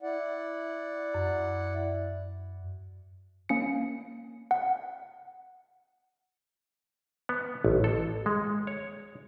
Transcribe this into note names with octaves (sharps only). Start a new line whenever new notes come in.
E4 D5 F#5
F#2
A#3 C#4 C#7
F#5
B3
A1
A4
G#3
C#5